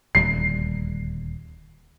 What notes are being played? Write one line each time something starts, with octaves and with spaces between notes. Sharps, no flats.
D#1 D2 G3 C7